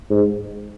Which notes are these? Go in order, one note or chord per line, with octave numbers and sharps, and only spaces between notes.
G#2